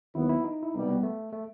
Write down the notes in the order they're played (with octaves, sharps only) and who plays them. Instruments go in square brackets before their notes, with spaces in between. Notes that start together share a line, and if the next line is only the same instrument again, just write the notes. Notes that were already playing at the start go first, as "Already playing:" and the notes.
[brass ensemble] D#2 D#3 F#3 B3 [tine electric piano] E4
[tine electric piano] E4
D#4
E4
[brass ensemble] C2 B2 G3 [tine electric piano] D#4
[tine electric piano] B3
A3
A3